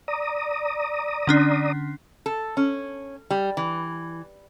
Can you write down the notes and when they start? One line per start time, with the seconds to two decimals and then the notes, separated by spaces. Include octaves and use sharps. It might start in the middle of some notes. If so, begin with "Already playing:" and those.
0.08 D5 A#5 D#6
1.27 D3 C#4 D4
2.26 A4
2.57 C#4
3.30 G3
3.57 E3